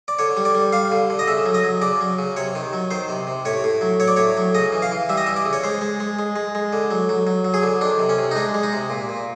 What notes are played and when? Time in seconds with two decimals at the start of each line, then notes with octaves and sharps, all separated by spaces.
0.08 D5
0.19 D3 C#5
0.37 G3
0.45 D5
0.55 G3
0.73 G3 F5
0.92 D3
1.10 D3
1.19 D#5
1.28 C#3 E5
1.46 F#3
1.54 D#5
1.64 F#3
1.82 C#3 D5
2.01 F#3
2.19 C#3
2.36 C3 C#5
2.55 D#3
2.73 F#3
2.91 D#3 C5
3.09 C3
3.27 C3
3.45 A2 C#5
3.64 A2
3.81 F#3
4.00 F#3 C#5
4.08 D5
4.17 A2 C#5
4.37 F#3
4.55 C#3 D#5
4.72 E3
4.82 F5
4.91 E3
5.09 G3 E5
5.17 D#5
5.27 E3 E5
5.36 D5
5.45 C#3
5.53 C#5
5.64 G#3 C5
5.81 G#3
6.00 G#3
6.19 G#3
6.36 G#3
6.55 G#3
6.73 D3
6.91 F#3
7.09 F#3
7.27 F#3
7.45 F#3
7.54 G#4
7.63 D3
7.81 D#3 D4
7.99 C3
8.09 C#4
8.18 C3
8.31 D#4
8.36 G#3 D4
8.54 G#3
8.63 D#4
8.73 C3
8.90 A#2
9.09 A#2